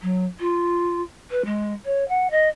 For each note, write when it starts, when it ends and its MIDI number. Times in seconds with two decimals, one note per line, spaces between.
0.01 0.25 54
0.39 1.02 65
1.30 1.44 71
1.45 1.73 56
1.85 2.07 73
2.08 2.27 78
2.30 2.48 75